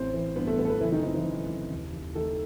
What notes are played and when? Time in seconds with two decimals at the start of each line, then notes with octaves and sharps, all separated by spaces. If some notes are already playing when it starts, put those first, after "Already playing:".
Already playing: A1 E3 C4 C5
0.14 E3
0.36 G2 B3 B4
0.47 A3 A4
0.58 A1 B3 B4
0.65 A4
0.70 B3 B4
0.81 F#1 E3 E4
0.92 D#3 D#4
1.03 D#3 C4
1.14 E3 E4
1.25 F#2
1.48 F#1
1.71 D#2
1.93 D#2
2.15 D#3 A3 A4